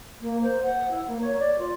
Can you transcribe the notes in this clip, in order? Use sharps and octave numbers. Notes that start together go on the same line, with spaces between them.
A#3
C5
F#5
E4
A#3
C#5
D5
F4